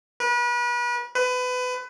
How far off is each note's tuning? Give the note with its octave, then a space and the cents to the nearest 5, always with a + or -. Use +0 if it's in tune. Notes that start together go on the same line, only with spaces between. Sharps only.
B4 -35
B4 +25